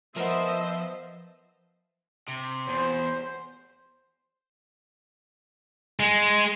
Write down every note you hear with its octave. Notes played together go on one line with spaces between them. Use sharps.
F3 B3 A#4 C5 D#5 E5
C3
E2 C5
G#3